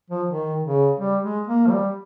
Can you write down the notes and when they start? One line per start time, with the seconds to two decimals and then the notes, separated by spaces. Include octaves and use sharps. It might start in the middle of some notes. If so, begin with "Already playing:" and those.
0.10 F3
0.28 D#3
0.64 C#3
0.99 G3
1.23 G#3
1.47 A#3
1.66 F3
1.70 G3